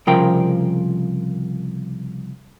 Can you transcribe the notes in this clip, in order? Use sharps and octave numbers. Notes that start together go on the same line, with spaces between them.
C2 C#3 F3 A#4 G5